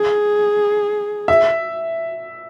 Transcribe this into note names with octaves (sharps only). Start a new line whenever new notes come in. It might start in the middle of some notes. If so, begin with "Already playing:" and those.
Already playing: G#4
E5